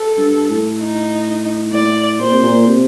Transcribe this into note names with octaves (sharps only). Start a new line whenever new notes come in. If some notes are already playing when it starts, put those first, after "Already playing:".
Already playing: A4
G2
A2
D#4
A2 D5
A#2 C5
C3
A#2
C3